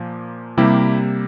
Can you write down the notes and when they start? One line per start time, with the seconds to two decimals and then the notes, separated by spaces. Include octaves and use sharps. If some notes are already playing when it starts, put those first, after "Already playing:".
Already playing: A#2 F3 A#3
0.57 C3 G3 A#3 E4 G4